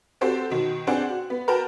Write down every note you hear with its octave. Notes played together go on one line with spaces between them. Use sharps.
C4 F#4 G4 A4 C5
B2 D#3
C4 D4 G#4 C5 F#5 G5
F#4
B3
F#4 A#4 B4 G5 A5 A#5